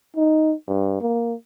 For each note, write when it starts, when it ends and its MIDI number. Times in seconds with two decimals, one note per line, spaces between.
0.16 0.53 63
0.68 1.01 43
1.01 1.34 58